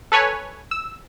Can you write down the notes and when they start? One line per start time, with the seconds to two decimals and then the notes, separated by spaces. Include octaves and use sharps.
0.12 A4 B4 C#5 G#5
0.71 E6